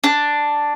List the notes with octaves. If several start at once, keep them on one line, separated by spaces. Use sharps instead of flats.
D4